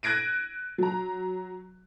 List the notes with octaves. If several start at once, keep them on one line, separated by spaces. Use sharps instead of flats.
F#6 G#6 A#6 D7 D#7
F#3 A#5